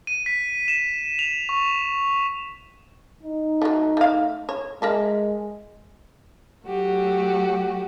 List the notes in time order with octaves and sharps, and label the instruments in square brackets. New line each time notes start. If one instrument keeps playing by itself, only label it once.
[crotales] D#7
B6
E7
F7
C#6
[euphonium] D#4
[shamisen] F#3 A3
A3 F5
C#5
[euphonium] G#3 [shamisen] A#4 E5 A5
[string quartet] F#3 A3 F#4 G4